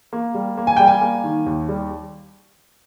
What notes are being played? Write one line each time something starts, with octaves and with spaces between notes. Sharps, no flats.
A#3
G3
A#3
G#5
G3 G5
G#5
A#3
D#3
D#2
G3